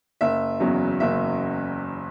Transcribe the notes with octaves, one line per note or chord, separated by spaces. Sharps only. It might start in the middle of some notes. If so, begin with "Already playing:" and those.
F#1 E5
E2 C#3 F#3
F#1 E5